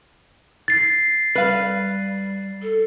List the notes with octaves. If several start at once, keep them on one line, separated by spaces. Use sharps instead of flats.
A6 C7
G3 B4 F5
A4